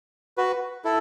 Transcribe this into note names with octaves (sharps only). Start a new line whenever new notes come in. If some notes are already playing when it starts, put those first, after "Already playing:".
F#4 B4
E4 A4